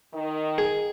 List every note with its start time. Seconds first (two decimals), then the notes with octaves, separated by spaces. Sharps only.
0.13 D#3
0.58 G#4